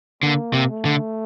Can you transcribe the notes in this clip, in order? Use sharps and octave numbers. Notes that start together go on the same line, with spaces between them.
D3 A#3
C3
A3
D3